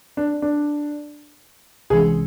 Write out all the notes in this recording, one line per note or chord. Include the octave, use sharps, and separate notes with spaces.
D4
D4
C2 C3 E3 G#3 C#4 G#4